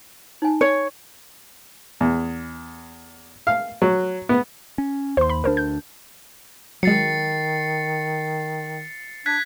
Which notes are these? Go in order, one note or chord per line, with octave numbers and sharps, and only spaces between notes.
D#4 G#5
C#5
E2
F5
F#3
B3
C#4
D#2 C5 C6
B5
D2 D4 A#4 C5
G6
D#3 F#3 G#3 A6 C7 C#7
D4 F#6 G#6 B6